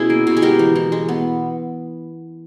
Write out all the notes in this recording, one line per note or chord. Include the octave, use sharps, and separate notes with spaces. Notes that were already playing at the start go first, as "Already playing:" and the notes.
Already playing: B2 C#4 E4 G#4
A#3
B2
G#4
G#3 G4 A#4
E3
E3
G#3
B3